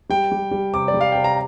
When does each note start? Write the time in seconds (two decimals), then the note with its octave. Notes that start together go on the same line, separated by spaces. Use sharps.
0.09 G3 G5
0.32 G3
0.51 G3
0.73 C3 D6
0.88 D5
0.94 G3
1.01 F5
1.12 C3 G5
1.24 A#5